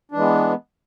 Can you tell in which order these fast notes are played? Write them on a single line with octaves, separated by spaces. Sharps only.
D4 E3 G#3 B3